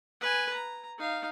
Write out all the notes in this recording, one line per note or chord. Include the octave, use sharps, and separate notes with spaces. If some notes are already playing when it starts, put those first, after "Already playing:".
B4 G#5
A#5
D#4 F5